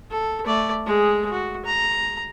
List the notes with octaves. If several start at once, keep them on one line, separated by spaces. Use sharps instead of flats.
A4
A3 D5
G#3 G#4
F#4
A#5